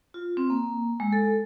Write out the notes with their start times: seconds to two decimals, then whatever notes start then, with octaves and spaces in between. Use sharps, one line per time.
0.14 F4
0.37 C4
0.50 A#3
1.00 G#3
1.13 A4